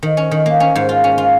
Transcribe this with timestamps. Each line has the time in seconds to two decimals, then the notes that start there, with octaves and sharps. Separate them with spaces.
0.03 D#3
0.17 C#4
0.31 D#3
0.46 A#3
0.60 C#4
0.75 G#2
0.89 F4
1.04 C#4
1.18 F4